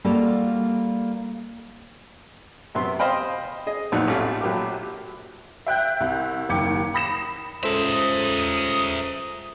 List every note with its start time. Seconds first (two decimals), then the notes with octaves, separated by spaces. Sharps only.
0.04 G3 A#3 F4 F#4 A4
2.75 F#2 C3 B3 C6
2.99 C5 D#5 F5 G5 B5
3.67 G#4 D#5
3.92 B1 F2 A#2 D#4 F#5
4.08 A1 A3 F4
4.41 A#1 F#3 G4 A#4 D6
5.67 E5 G5 F#6 G6
6.01 C2
6.49 F#1 D#2 G5 D6 G#6 C#7
6.94 B5 D#6 A#6 C7 E7
7.63 C#2 A4 A#4 C5 E5 D#6